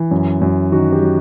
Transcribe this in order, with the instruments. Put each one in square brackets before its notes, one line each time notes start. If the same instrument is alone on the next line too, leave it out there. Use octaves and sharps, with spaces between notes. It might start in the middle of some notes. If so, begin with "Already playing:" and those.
Already playing: [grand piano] E3
F#2
F#2
D#3 F#4
G4
F#3